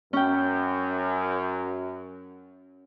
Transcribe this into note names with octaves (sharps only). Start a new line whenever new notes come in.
F#2 C#4 G5